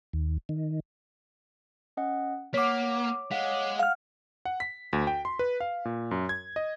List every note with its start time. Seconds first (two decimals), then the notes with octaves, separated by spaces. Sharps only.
0.13 D#2
0.49 D#3
1.97 C#4 D#5 F#5
2.54 A#3 C#5 F#5 D6 B6
3.31 G#3 F5 F#5 B6
3.79 F5 F#5 F6
4.45 F#5
4.60 B6
4.93 D2
5.07 G5
5.25 C6
5.39 B4
5.60 F5
5.85 A#2
6.11 F#2
6.29 G#6
6.56 D#5